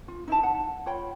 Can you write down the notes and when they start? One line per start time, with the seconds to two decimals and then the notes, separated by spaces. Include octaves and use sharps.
0.08 F4
0.27 D#4 E4 E5 A5
0.43 F#5
0.86 F4 C#5 G5 B5